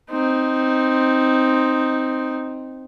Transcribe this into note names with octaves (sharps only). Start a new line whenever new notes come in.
C4 D#4